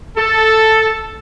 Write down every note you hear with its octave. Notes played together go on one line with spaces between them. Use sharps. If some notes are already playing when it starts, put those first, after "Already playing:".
A4